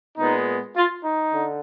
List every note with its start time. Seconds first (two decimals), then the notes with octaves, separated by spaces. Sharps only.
0.18 A#2 G#3 B3 D#4
0.76 F4
1.05 D#4
1.32 D3